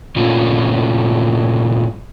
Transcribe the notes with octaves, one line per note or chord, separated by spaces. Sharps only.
G2 A#2 A3 C#4 F4